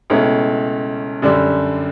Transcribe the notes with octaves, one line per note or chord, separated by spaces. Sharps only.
C#2 B2 A3 C#4 E4
F#2 D3 G3 D4